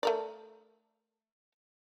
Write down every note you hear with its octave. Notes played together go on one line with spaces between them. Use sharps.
A3 A#4 D5